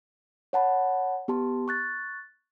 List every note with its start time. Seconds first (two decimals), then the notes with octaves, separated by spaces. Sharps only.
0.53 C#5 F#5 A5 B5
1.28 B3 G4 A5 C6
1.68 C#6 F#6 A6